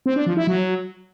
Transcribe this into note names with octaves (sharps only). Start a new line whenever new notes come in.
C4
D4
F3
E4
F#3